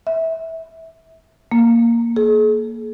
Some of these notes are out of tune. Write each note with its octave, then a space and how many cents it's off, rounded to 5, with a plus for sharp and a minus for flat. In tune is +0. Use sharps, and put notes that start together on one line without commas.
E5 -25
A#3 -5
G#4 +45